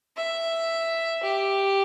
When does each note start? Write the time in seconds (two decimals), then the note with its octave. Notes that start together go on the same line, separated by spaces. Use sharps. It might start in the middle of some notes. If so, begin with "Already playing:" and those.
0.17 E5
1.24 G4